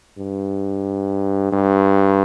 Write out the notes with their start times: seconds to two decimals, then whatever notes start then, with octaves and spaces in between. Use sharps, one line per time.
0.18 G2
1.52 G2